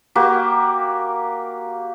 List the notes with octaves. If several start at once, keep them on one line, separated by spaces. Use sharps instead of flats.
A#3 F#4 G4